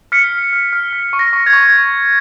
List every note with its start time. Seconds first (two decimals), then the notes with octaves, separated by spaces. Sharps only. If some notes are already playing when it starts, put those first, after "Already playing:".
0.12 F6 B6 C#7
0.33 F6
0.53 F6
0.73 F6
0.93 F6 B6
1.13 C#6
1.19 A#6
1.33 C#6
1.46 G#6
1.53 C#6